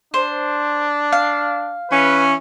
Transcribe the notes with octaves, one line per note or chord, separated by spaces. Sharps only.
D4 C5
F5
E3 C#4 B4